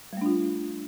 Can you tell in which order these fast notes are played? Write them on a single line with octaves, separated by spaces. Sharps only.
G3 A3 D4 F4